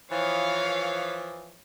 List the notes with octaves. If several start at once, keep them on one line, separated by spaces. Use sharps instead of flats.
E3 F3 C#5 F5